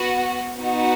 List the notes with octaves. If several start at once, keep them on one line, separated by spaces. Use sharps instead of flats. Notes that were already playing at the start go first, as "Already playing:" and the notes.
Already playing: B3 F#4
B3 D#4 F#4